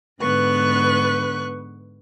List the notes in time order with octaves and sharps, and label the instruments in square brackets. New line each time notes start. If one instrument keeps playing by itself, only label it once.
[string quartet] G#2 D3 B3 B4 C#6 F#6